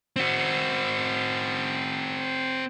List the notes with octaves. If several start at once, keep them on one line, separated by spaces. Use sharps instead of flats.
C4 F#4